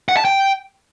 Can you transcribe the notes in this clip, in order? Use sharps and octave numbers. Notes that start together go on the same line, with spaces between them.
F#5
A5
G5